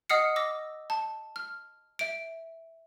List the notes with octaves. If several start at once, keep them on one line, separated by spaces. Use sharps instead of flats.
D#5 F#5 D#6 F6 C7 C#7
D6 E6 A#6
A5
F6
E5 D7